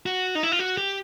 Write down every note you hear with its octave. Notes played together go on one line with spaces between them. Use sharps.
F#4
D#4
E4
F4
F#4
G4